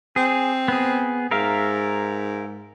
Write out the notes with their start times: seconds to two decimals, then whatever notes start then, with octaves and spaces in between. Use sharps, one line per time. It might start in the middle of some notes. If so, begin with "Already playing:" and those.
0.16 C4 G#4
0.68 B3 G#4
1.31 G#2 A#4 E5 F5